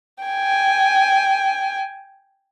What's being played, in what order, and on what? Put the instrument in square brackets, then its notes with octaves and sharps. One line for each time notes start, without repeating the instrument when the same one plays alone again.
[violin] G5 G#5